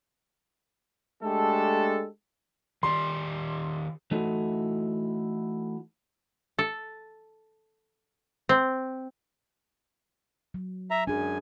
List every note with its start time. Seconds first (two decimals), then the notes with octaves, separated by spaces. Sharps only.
1.23 G#3 A3 D4 G4 A4
2.83 D#3 G4 D5 C6
4.11 E3 A3 D#4 E4 F#4 A4
6.59 A4
8.49 C4
10.54 F#3
10.91 E5 A#5
11.07 F#2 D4 G#4 G#5